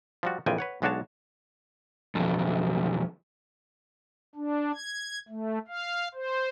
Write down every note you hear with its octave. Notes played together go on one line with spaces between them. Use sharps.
F3 G3 F#4
A#1 F2 E3 F3 G5 G#5
B4 C#5 F#5
B1 G#3 D4 F#4 C#5 A5
B1 F2
D4
G#6
A3
F5
C5